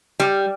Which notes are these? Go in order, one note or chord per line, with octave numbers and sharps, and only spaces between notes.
G3